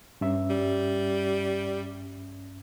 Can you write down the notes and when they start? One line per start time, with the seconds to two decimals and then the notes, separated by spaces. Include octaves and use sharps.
0.21 G2 C#4 E5
0.50 G3